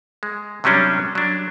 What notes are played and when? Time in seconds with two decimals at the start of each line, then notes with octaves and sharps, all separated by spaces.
0.23 G#3
0.64 C3 F#3 G3 C#4 D4
1.15 F#3 D4